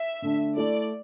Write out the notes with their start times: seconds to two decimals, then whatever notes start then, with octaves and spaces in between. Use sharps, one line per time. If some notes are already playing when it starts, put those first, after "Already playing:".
Already playing: E5
0.22 D3 A3 D4
0.56 A3 E4 A4 D5